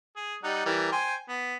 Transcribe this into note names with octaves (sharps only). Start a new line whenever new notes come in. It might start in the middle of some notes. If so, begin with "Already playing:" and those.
G#4
G3 D#4 F#5
E3 G3 A#4
C5 G5 G#5
B3